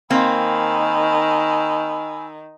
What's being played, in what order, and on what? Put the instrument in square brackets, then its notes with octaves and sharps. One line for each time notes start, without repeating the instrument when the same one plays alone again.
[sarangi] D#3 [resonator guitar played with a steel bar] A#3 C4 [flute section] G#5 B5 E6